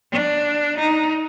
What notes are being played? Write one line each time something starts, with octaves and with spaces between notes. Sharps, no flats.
D4
D#4